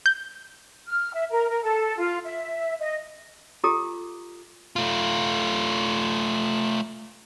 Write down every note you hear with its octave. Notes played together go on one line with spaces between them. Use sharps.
G6
F6
E5
A#4
A#4
A4
F4
E5
D#5
F4 G4 A4 A#5 D6 D#6
A3 F4